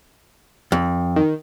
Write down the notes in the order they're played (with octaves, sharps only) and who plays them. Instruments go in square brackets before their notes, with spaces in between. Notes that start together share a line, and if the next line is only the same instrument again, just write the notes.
[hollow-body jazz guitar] F2
[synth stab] D#3